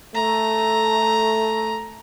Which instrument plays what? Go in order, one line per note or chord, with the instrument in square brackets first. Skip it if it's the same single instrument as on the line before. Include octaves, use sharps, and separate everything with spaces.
[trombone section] A3 [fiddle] A#5